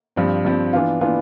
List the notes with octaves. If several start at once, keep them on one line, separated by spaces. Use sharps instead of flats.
G2 F3 C4
G2 F3 C4
E3 B3 D4 F4
E3 B3 D4 F4